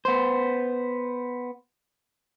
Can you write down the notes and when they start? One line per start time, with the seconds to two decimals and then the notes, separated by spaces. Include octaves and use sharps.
0.05 B3 C5